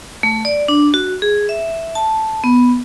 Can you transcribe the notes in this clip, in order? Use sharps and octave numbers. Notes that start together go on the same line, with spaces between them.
A3
D5
D4
F#4
G#4
E5
A5
B3